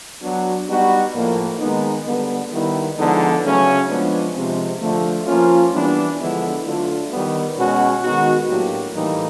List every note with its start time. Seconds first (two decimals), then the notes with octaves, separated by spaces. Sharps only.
0.22 F#3 B3 D4 F#4
0.67 G3 B3 D#4 F#4
1.14 A2 F3 A#3
1.59 D#3 G#3 B3 D#4
2.05 D3 G3 B3
2.51 D#3 G3 B3 E4
2.97 D3 F3 G#3 B3 D#4
3.43 C#3 F#3 A3 C#4
3.88 F3 G#3 B3 D4
4.35 C3 F3 G#3 C4
4.80 D3 F3 A3
5.26 F3 A#3 C#4 F4
5.72 E3 G3 B3 D4
6.19 D3 F3 G#3 B3 E4
6.64 D3 F#3 A3 D4 F4
7.11 D#3 G3 B3
7.56 B2 G#3 C#4 F#4
8.02 D#3 G#3 B3 D#4 F#4
8.48 A2 F#3 A#3 D4 G4
8.94 A2 E3 G3 A#3 D#4